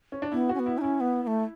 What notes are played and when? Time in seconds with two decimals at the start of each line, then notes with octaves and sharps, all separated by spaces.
0.12 C#4
0.22 D4
0.32 B3 E4
0.49 F#4
0.54 C#4
0.59 B3
0.66 E4
0.78 D#4
0.81 C#4 E4
1.00 B3
1.23 B3
1.27 A3